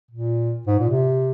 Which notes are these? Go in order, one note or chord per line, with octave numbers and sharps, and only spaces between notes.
A#2
G#2
A#2
C3